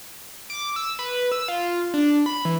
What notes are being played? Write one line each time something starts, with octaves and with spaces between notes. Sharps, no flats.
D6
E6
B4
E6
F4
D4
B5
E3